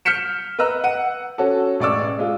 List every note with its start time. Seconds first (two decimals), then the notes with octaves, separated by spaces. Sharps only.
0.05 F6 G6 B6 C#7 E7
0.59 B4 D#5 A#5 E6 F#6
0.84 F#5 D#7
1.38 C#4 F#4 A4
1.80 A1 G#3 D5 C#6 D6 E6
2.19 G#3 F4